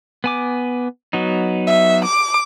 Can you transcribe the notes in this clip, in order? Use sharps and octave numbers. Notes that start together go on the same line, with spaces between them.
B3 G#5 D6
F#3 B3 D#4
E5
D6